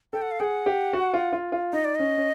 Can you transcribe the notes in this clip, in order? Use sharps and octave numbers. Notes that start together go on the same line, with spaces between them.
A4 G5
F#5
F5
G#4 F#5 G5
G4
F#4
F4
F4
F4
D#4 D#5
D5
C#4 D#5
C#4